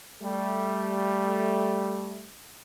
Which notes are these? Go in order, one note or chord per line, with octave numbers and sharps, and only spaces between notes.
G3 A3